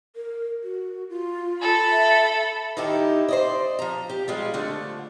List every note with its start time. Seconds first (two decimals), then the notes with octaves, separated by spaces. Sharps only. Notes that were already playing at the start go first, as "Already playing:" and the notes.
0.16 A#4
0.63 F#4
1.10 F4
1.60 A4 B5
1.91 E5
2.77 D#3 D#4 E4 G4
3.28 C5 D5 D#5
3.79 F3 A#5
4.10 G4
4.28 G3 G#3 F4
4.54 D3 F3 A3